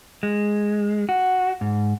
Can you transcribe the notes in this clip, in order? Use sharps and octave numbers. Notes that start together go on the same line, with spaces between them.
G#3
F#4
G#2